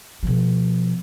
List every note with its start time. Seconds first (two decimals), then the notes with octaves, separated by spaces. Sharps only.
0.23 B2 F3